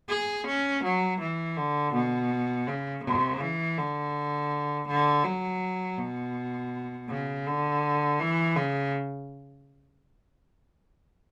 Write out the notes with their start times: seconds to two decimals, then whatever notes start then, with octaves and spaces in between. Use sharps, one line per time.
0.09 G#4
0.47 C#4
0.84 F#3
1.20 E3
1.57 D3
1.94 B2
2.67 C#3
3.04 C#3
3.41 E3
3.78 D3
4.88 D3
5.25 F#3
5.98 B2
7.09 C#3
7.46 D3
8.20 E3
8.56 C#3